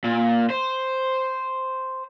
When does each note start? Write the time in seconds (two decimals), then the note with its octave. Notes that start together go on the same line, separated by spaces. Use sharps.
0.04 A#2
0.50 C5